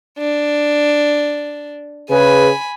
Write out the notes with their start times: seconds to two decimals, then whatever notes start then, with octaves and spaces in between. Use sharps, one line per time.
0.19 D4
2.10 C#3 G#4 B4 G#5 B5